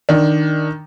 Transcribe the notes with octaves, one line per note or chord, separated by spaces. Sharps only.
D#3 D4